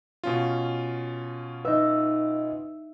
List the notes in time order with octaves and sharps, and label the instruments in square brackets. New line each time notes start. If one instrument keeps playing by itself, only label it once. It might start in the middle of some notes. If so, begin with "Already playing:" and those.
[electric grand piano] B2 C#4 F4
[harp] D#4 E5 [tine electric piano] B4 D#5